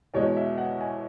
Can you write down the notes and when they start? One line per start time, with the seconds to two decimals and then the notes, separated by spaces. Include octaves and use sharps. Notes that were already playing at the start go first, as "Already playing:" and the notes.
0.14 E2 B2 G#3 C#5
0.37 E5
0.58 F#5
0.81 G#5